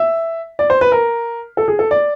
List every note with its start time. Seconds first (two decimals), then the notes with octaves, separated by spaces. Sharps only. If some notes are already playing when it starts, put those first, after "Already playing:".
Already playing: E5
0.59 D5
0.70 C5
0.81 B4
0.92 A#4
1.57 A4
1.68 G#4
1.79 A4
1.91 D5